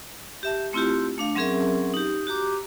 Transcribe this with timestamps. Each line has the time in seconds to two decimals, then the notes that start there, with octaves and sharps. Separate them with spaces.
0.43 G4 E5 A5
0.73 A3 C4 E4 F4 G4
1.18 A3 D4 F5
1.35 F#3 C4 C#4 G#4 A#4 E5
1.94 D#4 G4
2.27 F#4 G4 A#5 D6